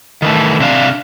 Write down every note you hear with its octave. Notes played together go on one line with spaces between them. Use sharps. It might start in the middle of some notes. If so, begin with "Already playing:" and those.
D#3 E3 A3
C3 D4 F5